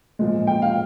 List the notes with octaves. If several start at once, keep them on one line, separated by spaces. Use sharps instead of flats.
A#2 F3 G#3
G5
F5